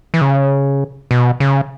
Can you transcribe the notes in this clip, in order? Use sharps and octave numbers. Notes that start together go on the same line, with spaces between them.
E3
C#3
B2
C#3